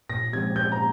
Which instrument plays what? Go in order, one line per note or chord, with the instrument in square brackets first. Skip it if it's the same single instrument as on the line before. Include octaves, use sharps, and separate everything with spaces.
[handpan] A#2 [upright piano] A#6
[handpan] F3 G#3 C4 G4 [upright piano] G#6
[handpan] A#2 [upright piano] G6
[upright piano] A#5